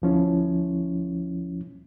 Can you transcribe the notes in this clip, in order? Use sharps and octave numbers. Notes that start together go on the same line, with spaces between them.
D2 F3 C#4 E4